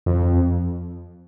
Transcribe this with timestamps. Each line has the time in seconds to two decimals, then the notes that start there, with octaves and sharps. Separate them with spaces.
0.06 F2